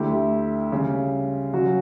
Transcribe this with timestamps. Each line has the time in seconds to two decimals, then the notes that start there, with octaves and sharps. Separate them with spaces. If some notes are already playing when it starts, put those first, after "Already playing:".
Already playing: D2 D3 A3 E4 G4
0.72 C#3 G3 C#4
1.53 C#3 F#3 C#4 F#4